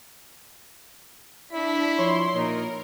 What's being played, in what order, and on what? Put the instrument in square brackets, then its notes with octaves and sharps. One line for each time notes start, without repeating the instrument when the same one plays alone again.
[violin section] D4 B6 [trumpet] E4
[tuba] F3 [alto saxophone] C#5 [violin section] C6
[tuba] A#2 [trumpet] D#4 [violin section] A#4 [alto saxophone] C#5